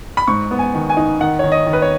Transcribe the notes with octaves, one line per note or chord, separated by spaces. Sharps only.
B5
G#2 C#6
B3
G#5
D#3
G#5
D#4
D#3 F#5
D#3 C#5
D#5
D#3
B4
C#5